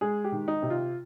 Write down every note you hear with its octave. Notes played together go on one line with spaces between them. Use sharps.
G#3 G#4
G4
D#3
D#4
C3
F4